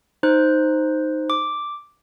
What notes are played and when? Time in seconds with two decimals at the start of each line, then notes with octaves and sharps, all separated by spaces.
0.23 D#4 C5 F#6
1.30 D6